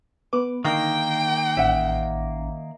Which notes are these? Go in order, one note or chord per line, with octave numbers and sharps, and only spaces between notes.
B3 B4 D6
D3 D#3 A#3 D#4 G5
A1 C#4 E5 F#5